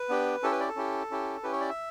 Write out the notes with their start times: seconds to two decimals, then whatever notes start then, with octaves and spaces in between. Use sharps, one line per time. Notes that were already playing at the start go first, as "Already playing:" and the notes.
Already playing: B4
0.09 B3 D4 G4
0.43 C#4 E4 G4 A4
0.52 B4
0.60 D5
0.68 A4
0.76 C#4 E4 G4
1.11 C#4 E4 G4
1.43 C#4 E4 G4 B4
1.52 C#5
1.60 D5
1.70 E5